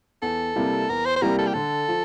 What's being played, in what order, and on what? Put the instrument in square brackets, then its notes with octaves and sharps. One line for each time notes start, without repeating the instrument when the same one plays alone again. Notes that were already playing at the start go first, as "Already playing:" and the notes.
[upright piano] E2 [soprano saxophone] A4
[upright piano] C3 G3 A#3 E4
[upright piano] E2 [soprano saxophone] A#4
[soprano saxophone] C5
C5
[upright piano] C3 G3 A#3 E4 [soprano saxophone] A#4
[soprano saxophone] A4
G4
[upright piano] D3 [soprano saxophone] A4
[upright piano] F3